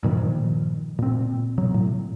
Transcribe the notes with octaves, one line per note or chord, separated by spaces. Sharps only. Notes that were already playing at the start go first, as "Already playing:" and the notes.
G2 A#2 D#3 F3
A#2 C4
B2 F#3
A2